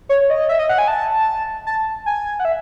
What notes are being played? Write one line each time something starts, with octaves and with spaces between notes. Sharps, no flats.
C#5
D#5
E5
D#5
F#5
G#5
A5
A5
G#5
F#5
E5